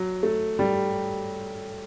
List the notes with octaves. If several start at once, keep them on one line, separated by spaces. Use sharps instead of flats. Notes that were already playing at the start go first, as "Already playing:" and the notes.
Already playing: F#3
A3
G3